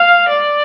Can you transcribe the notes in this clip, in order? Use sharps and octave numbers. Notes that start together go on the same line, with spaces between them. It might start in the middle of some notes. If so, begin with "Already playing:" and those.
Already playing: F5
D5